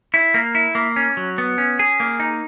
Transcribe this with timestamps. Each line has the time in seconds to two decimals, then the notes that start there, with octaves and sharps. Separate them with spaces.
0.14 E4
0.34 A#3
0.55 E4
0.75 A#3
0.96 C#4
1.17 F#3
1.38 B3
1.58 C#4
1.79 G#4
2.00 A#3
2.20 D#4